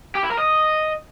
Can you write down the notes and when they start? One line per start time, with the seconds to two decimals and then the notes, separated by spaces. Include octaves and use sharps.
0.15 G4
0.23 E4
0.31 A#4
0.39 D#5